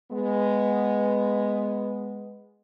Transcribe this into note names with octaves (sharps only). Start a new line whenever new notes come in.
G#3 B3